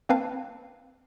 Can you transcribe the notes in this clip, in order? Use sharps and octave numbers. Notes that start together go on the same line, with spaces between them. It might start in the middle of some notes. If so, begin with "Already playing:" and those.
A#3 C4 B4 F5 A5